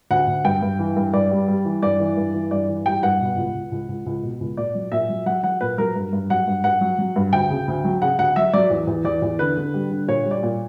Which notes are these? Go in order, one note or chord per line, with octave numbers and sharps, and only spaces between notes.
D2 F#5
D2
G2 G5
G2
E3
G2
G2 D5
G3
G3
E3
G2 D5
E3
G2
E3
G2 D5
E3
G3 G5
G2 F#5
B2
C#2
C#2
C#2
C#2
C#2
B2
C#2
A#2 D5
F#3
A#2 E5
F#3
F#3 F#5
F#3 F#5
A#2 B4
F#3 A#4
G2
G2
F#3 F#5
G2
G2 F#5
F#3
F#3
G2
D2 G5
C#3
D2
F#3
C#3 F#5
D2 F#5
F#3 E5
F#3 D5
E2
E2
E2 D5
E2
D3 B4
D3
G3
D3
A#2 C#5
G3
D5
A#2